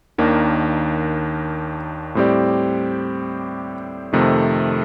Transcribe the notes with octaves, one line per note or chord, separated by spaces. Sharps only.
D#2 D#3 A#3 D4
A2 G3 C4 G4 D5
F2 C3 D#3 A3